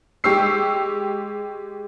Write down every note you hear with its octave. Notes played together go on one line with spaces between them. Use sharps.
G#3 G4 C#6 E6 C7